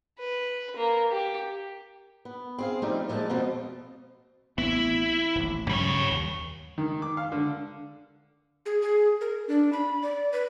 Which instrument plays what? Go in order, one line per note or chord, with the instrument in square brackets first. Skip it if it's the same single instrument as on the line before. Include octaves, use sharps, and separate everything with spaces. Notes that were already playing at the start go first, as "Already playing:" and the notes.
[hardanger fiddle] B4
A#3
G4
[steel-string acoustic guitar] B3
C4 G#4 F5
F3 G3 A3 C4 D#4
A#2 F3 G#3 A3 D#5 A5
F2 B2 F3 C4 F4 D#5
[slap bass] A1 B3 C4 [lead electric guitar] E4
[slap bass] D#1 A1
[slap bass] G2 C#3 F#3 [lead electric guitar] G3 C#5
[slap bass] D#2
[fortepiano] D#3
D6
F5
D3
[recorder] G#4
G#4
A#4
D4
B5
D5
B4